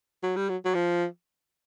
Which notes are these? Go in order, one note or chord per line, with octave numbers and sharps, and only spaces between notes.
F#3
G3
F#3
F#3
F3